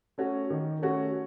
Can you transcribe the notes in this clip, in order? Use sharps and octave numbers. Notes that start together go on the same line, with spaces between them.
A3 C#4 F#4
D#3
A3 C#4 F#4